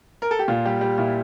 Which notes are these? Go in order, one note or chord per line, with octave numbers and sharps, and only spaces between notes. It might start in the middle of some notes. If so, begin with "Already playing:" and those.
A#4
A4
G4
A#2 F4
G3 G4
G3
A#2 E4